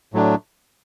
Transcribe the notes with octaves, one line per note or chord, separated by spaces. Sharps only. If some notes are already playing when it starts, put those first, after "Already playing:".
A2 F#3 A3 D4